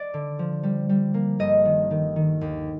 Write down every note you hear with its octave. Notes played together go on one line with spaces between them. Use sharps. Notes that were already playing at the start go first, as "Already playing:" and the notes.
Already playing: D5
D3
F3
G3
G3
A#3
G1 D#5
D#3
D#3
D#3
D#2